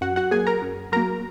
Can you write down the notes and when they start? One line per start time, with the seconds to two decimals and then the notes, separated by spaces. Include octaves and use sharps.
0.01 F#2 F#4 F#5
0.16 F#4 F#5
0.31 F#3 A#3 G#4 G#5
0.47 A#4 A#5
0.62 F#2
0.92 F#3 A#3 A#4 A#5